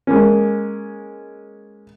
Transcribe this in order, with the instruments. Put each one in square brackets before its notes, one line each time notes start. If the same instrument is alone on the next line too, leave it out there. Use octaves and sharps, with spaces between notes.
[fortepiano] G#3 A#3 C#4